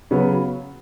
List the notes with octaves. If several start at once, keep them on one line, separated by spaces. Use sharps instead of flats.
C#3 F#3 B3